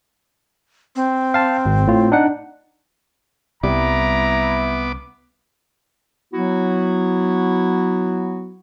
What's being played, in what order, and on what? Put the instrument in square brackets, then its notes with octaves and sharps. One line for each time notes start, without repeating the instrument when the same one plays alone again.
[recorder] C4
[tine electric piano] F5 A5
G#1
A2 F4
D4 D#4 F#5
[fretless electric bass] C2 G3 [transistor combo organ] B3 D6 [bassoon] E4 [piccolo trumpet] A#5
[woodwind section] F#3 B3 E4 F#4